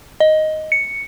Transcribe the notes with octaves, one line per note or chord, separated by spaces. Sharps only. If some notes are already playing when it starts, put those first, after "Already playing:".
D#5
C#7